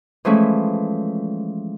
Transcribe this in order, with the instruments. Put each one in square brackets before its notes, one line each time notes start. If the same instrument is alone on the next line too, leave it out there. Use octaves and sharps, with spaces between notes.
[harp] E3 F3 G#3 A3 C#4 E4